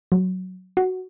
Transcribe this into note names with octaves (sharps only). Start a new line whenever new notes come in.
F#3
F#4